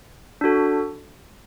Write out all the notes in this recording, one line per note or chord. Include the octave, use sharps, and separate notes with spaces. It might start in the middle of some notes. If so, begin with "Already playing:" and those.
D4 F#4 A4